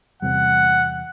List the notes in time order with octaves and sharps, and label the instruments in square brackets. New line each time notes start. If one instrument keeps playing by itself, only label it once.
[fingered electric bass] E2 C3 G3 [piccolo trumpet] F#5